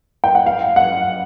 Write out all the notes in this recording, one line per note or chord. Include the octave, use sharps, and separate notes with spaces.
G5
F#5
F5
F#5